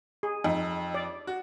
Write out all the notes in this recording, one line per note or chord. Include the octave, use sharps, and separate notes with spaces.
G#4
F2 D#4
D5
F#4